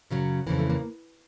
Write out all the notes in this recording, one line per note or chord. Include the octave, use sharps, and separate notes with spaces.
F#2 C#3 F#3
F2 C#3 E3 A#3
A3
A#3